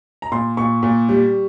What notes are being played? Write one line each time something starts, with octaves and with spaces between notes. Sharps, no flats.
A#5
A#2 C6
A#2 C#6
A#2
G3